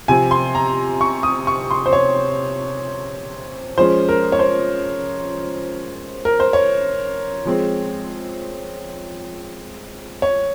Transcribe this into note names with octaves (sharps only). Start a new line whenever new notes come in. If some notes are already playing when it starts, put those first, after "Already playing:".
C3 F3 C4 G#5
C6
A#5
C#6
D#6
C#6
C6
C5
C#5
F3 G#3 C#4 C5
A#4
C#5
C5
A#4
C5
C#5
F3 G#3 C4
C#5